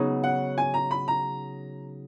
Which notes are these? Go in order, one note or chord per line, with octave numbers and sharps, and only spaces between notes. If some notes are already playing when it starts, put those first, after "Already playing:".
Already playing: C#3 F#3 B3 D#4 G#4
F#5
G#5
A#5
B5
A#5